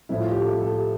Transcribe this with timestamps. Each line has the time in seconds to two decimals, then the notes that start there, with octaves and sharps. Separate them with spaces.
0.09 A2 F3 E4
0.20 F4
0.31 G4
0.41 A4
0.51 G4
0.61 A4
0.71 G4